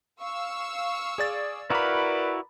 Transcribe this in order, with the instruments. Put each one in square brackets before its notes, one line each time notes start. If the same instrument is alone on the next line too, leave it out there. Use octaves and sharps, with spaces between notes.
[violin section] F5 C#6 E6
[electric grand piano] G#4 D5 A6
[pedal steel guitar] E4 F#4 F5 [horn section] A#4 B4 D5 [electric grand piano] A#5 B5